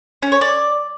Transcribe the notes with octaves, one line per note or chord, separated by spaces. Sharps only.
C#4
C#5
D5